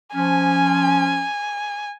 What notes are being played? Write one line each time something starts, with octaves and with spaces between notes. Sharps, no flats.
F3 C#4 G#5